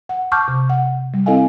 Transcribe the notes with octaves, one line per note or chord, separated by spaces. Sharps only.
F#5
A5 C#6 D6 F6 G6
C3
F#5
G3
C4 E4 A4 D#5 F5 G#5